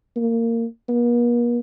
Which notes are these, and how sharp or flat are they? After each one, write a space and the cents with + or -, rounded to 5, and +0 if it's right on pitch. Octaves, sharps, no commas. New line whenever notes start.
A#3 -20
A#3 +45